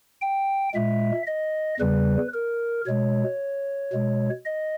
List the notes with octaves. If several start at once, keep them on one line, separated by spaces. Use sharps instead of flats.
G5
A#2 G#3 E5
D#5
E2 C#3 G3 B4
A#4
B2 G#3 C#5
B2 G#3
D#5